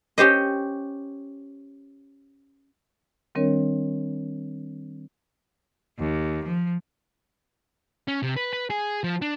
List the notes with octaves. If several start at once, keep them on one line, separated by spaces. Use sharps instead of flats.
C#4 G4 C5 D#5
D#3 G3 C4 D4 A#4 C#5
D#2
F3
C#4
C3
B4
B4
G#4
F3
D4